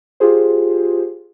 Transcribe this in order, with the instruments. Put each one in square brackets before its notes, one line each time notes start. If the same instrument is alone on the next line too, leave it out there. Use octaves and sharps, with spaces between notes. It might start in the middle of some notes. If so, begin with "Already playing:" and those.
[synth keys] F4 G4 G#4 C5